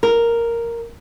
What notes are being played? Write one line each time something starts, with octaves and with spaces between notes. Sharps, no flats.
A#4